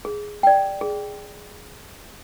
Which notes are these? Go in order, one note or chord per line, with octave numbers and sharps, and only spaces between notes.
G#4
D5 G5
G#4